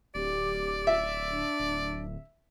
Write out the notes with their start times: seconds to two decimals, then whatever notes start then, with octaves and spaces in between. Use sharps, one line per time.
0.15 D1 G4 D5
0.87 E5
1.31 D4
1.60 D1